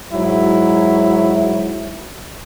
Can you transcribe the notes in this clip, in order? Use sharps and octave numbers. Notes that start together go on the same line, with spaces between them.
G#2 F#3 E4